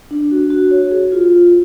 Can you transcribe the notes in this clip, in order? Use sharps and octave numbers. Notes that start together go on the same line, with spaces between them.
D4
F#4
F#4
C#5
G#4
F4
F4